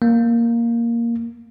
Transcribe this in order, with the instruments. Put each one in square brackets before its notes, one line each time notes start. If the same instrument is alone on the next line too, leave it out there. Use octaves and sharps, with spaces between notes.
[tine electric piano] A#3